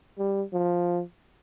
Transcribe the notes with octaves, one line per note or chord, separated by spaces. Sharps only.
G3
F3